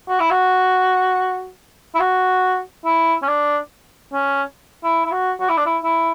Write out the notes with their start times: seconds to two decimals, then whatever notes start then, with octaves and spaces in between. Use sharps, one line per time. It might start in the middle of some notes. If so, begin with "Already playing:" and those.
0.09 F#4
0.20 E4
0.31 F#4
1.95 E4
2.00 F#4
2.85 E4
3.22 C#4
3.28 D4
4.13 C#4
4.84 E4
5.05 E4
5.12 F#4
5.40 F#4
5.49 E4
5.57 D4
5.66 E4
5.83 E4